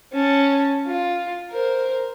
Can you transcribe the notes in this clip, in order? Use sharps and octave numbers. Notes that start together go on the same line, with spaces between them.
C#4 A5
F4
A#4 C5